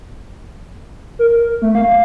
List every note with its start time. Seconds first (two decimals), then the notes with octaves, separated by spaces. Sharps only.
1.19 A#4
1.62 A3
1.75 F5